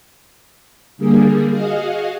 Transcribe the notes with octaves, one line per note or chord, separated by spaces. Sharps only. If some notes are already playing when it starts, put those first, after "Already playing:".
D3 G3 A#3 G#4
F#4 G#4 D#5 F5